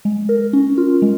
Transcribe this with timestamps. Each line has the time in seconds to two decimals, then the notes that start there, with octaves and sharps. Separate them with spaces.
0.05 G#3
0.29 A#4
0.53 C#4
0.78 F4
1.02 G#3